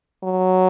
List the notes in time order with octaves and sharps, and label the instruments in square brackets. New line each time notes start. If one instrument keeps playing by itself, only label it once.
[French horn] F#3